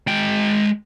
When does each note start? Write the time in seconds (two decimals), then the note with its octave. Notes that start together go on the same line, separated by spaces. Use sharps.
0.07 G#3 G5